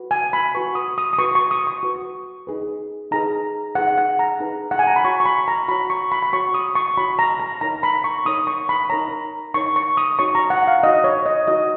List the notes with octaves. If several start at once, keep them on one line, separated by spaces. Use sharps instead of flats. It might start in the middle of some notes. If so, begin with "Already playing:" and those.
Already playing: F#4 B4
G#5
B5
F#4 B4 C#6
D#6
D#6
D#6
F#4 B4 C#6
C#6
D#6
C#6
F#4 B4
D#4 G#4 B4
D#4 G#4 B4 A#5
D#4 G#4 B4 F#5
F#5
A#5
D#4 G#4 B4
F#5
G#5
A#5
B5
F#4 C#5 C#6
C#6
B5
A#5
F#4 C#5 B5
C#6
B5
B5
F#4 C#5 C#6
D#6
C#6
F#4 C#5 B5
A#5
A#5
D#4 A#4 C#5 A#5
B5
C#6
D#4 A#4 C#5 D#6
C#6
B5
D#4 A#4 C#5 A#5
D#4 A#4 C#5 C#6
C#6
D#6
D#4 F#4 C#5 C#6
A#5
F#5
F5
D#4 F#4 C#5 D#5
C#5
D#5
D#4 F#4 C#5 D#5